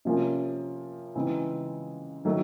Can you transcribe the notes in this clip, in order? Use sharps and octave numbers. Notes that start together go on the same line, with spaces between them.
C3 F3 A#3 C#4
C#3 E3 G#3 C4 D#4
D#3 F#3 A3